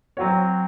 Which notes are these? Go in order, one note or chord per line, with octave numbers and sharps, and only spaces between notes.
F#3 C4 F#4 C#5